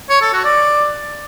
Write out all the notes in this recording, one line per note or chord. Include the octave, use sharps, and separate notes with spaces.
C#5
A4
F#4
D5